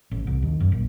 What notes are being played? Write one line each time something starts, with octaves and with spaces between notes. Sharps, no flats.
A1
C2
D#2
F#2
A#1